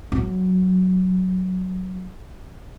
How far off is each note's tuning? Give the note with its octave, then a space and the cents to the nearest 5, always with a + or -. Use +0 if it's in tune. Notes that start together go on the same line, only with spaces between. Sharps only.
F#3 +0 C#4 +0